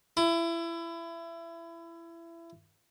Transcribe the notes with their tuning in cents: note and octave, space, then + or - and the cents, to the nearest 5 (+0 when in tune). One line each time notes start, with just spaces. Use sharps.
E4 +25